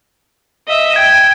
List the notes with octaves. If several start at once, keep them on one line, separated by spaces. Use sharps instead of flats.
D#5 E5
G5 G#6